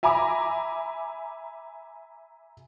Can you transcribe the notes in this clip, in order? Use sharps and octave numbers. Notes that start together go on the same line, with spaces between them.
E5 G#5 A#5 B5 D6